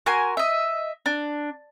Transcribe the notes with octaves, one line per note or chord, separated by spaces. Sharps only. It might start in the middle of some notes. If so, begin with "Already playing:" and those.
F#4 A#4 G#5 C6
D#5 E5
D4